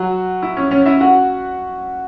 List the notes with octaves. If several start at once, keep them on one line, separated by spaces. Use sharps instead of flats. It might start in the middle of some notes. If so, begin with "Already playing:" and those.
Already playing: F#3 F#4
E4
C#4
C#4 C#5
E4 E5
F#4 F#5